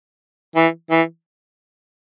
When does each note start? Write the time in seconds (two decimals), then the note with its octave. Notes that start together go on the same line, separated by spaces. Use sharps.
0.56 E3
0.91 E3